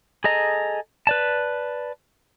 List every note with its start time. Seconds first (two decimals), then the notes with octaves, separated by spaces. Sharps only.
0.24 G#4 A4 D#5 A#5
1.07 B4 D5 A5